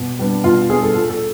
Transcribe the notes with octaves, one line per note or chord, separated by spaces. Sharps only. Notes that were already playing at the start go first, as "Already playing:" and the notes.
Already playing: B2
G3 B3 D4
B2 F4
G3 B3 D4 G#4
A4
A#2 A4
A4